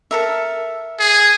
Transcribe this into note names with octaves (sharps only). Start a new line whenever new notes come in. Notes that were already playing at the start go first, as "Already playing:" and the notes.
A4 A#4 E5
G#4